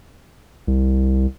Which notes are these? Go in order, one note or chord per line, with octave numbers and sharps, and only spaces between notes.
C2